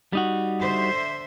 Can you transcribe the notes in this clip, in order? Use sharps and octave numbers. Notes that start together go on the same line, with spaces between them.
G3 D#4 F#4
D3 C5 E5